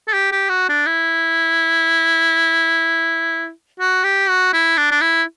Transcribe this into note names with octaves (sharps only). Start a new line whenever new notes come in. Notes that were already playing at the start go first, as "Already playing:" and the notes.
A4
G4
G4
F#4
D4
E4
F#4
G4
F#4
E4
D4
D4
E4